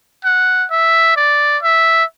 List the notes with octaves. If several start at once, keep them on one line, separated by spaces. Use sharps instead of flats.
F#5
E5
D5
E5